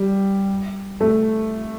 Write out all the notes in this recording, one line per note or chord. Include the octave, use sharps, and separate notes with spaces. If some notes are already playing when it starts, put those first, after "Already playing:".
Already playing: G3
A3